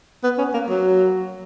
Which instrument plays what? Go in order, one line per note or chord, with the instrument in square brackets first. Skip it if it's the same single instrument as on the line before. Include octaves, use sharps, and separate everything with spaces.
[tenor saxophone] B3
C#4
A#3
F#3